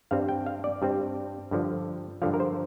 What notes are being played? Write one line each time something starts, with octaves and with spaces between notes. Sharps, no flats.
G2 G3 C4 F5
G5
F5
D5
G2 G3 C4
G2 D3 F3
G2 D3 F3 F5
A#4
C5